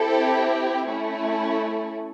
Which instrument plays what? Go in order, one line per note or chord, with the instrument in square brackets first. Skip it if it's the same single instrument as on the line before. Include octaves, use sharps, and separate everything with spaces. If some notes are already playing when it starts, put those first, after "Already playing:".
Already playing: [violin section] C4 E4 G4 A4
A3 C#4 E4